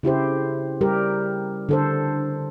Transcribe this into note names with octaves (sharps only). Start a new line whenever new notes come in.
C#3 E4 G4 C5
G3 G4 A#4
D3 A4 C5